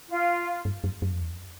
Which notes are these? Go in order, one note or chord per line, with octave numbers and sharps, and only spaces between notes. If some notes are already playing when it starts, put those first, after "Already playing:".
F4
G2
F#2
F#2
F2
E2
F2